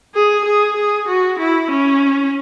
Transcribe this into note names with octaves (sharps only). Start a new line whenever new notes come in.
G#4
G#4
G#4
F#4
E4
C#4